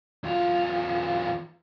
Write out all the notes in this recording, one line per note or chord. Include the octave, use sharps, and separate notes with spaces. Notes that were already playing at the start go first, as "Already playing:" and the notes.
E2 F4